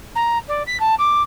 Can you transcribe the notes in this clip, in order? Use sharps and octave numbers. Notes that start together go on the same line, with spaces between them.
A#5
D5
B6
A5
D6